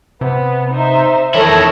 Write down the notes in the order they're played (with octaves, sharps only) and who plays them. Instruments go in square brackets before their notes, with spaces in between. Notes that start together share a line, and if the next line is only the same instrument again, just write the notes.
[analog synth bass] C3 [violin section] B3
[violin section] D#4 C5 E5
[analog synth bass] E2 [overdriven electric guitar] D#3 E4 [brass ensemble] A4 C#5 [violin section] A#6